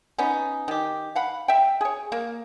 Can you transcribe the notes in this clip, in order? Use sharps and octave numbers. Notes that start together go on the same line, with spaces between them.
B3 C#4 D#4
D#3 G4
F5 F#5 B5
E5 G5
G#4 C#5
A#3